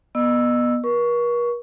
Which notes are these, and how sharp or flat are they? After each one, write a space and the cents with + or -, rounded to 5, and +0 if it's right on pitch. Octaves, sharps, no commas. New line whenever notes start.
B3 -20 D#5 -30 E6 +0
A#4 +45 C#6 +15